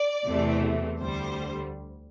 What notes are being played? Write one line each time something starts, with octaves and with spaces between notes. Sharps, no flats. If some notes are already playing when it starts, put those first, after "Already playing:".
Already playing: D5
E2 C3 E3 A3
D2 D3 G3 C5